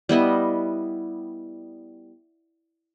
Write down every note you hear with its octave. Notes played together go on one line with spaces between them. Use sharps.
G3 B3 E4 D#5